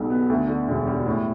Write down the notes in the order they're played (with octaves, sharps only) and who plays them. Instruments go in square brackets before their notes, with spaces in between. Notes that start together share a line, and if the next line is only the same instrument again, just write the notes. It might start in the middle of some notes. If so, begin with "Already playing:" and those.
Already playing: [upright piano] B1 B2 G3
B3
D2
D3
E1
G3
A2